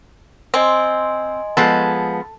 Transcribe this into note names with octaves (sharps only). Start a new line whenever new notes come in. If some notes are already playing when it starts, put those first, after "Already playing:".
C4 D#5 G#5 C6
F3 G#3 B3 A4